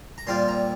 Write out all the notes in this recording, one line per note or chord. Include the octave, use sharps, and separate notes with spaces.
A#5
A#2 G3 C4 F4 C6
A#5